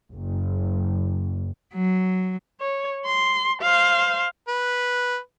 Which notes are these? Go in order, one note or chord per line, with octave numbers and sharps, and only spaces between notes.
F#1
F#3
C#5
C6
C5 F5
B4